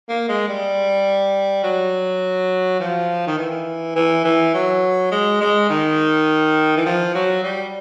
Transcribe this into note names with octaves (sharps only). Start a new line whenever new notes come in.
A#3
G#3
G3
F#3
F3
D#3
E3
E3
E3
F#3
G#3
G#3
D#3
E3
F3
F#3
G3